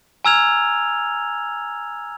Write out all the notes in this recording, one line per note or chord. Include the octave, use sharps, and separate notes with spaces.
G#5 A#5 E6 F6 G#6 F7